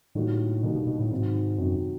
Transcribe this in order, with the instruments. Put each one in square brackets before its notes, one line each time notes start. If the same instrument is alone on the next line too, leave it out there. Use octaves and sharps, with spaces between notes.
[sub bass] A2 [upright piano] D3 G3 A#3 D#4 F#4
[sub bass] B2 [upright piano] D3 G3 A#3 D#4 F#4
[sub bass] B2
B2
A2
[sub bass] G#2 [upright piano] C3 D#3 F#3
[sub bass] F#2 [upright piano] C3 D#3 F#3